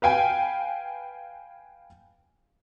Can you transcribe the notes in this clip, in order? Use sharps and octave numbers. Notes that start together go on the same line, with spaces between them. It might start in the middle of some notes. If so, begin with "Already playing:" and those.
B4 F5 G5 G#5